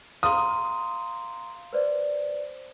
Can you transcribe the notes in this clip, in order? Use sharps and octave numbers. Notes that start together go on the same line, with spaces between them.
F5 A#5 C6 D#6
B4 C5 D5